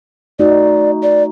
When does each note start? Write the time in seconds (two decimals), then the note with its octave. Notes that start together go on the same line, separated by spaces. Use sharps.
0.39 A3 D#4 F#4 D5
1.03 D5